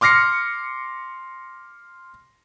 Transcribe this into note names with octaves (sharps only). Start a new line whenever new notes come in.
C6 D6 F6 A#6 C7 C#7